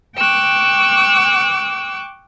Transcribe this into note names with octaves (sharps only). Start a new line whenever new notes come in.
G5 C#6 D6 E6 F#6